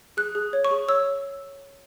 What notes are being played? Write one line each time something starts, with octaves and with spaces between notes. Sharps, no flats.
G#4 F#6
G#4
C#5
C#6
G#4
C#5 E6